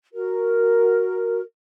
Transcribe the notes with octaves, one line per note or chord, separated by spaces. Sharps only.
F#4 A#4